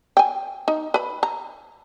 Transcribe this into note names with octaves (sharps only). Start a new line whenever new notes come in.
G5 G#5
D#4
B4 B5
A#5